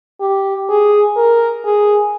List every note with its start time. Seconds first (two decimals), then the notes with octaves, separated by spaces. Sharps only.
0.21 G4
0.69 G#4
1.16 A#4
1.65 G#4